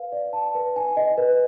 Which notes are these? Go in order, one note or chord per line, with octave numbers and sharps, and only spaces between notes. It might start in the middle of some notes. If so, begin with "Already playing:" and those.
Already playing: B4 F5
D5
A5
B4
G#5
D#5
B4